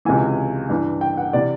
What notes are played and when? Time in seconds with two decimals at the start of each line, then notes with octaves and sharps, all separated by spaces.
0.05 C#2 C3 E3 G#5
0.70 G2 E3
1.01 G5
1.17 F#5
1.33 C3 E3 D5